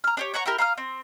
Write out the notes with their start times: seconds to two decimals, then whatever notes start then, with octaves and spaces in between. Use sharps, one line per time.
0.04 A#5 F6
0.17 D4 G4 C#5
0.34 C#5 F#5 A#5 C#6
0.46 E4 G4 A#4
0.58 F5 A#5 D#6 F6
0.78 C4